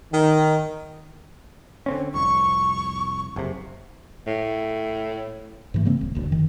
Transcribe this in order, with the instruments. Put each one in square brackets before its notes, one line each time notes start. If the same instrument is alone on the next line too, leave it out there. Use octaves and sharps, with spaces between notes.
[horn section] D#3
[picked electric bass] D3 C4 C#4
[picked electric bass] F1 C2 [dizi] C#6
[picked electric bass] F#1 C3
[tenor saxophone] A2
[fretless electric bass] G#2 E3 A3
C#3 G#3 A#3 C4
D#1
D#1 D2
F#2 D#3